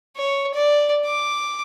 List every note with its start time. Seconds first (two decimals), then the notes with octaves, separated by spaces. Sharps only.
0.17 C#5
0.54 D5
1.05 D6